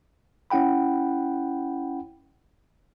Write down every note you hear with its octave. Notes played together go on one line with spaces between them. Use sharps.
C#4 E4 F#5 G5 B5